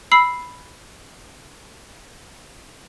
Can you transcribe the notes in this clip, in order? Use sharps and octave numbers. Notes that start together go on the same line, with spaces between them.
B5 E6 C7